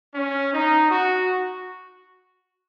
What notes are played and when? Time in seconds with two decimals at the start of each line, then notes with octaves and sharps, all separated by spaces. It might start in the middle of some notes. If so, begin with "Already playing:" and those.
0.15 C#4
0.54 D#4
0.91 F#4